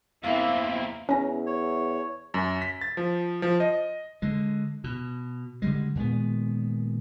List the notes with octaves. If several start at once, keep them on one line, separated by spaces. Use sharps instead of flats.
E2 A#3 C4 E4 F5
E2 C#4 A#5
C#5
F#2
B6
A6
F3
F3
D#5
D3 G#3
B2
D3 G3 G#3
A#2 D#3 G#3 B3